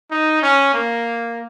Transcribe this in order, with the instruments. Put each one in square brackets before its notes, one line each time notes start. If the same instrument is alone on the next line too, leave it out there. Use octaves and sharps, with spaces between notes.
[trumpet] D#4
C#4
A#3